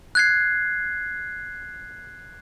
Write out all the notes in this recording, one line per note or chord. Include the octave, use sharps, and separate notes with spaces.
F#6 G#6 C7